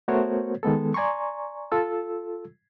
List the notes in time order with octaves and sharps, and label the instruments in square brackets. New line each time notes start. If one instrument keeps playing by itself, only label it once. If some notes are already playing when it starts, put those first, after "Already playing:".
[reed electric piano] A3 B3 F#4 A#4 C5 C#5
D#3 G#3 B3 A4
D5 G#5 A#5 C6 C#6
F4 A4 E6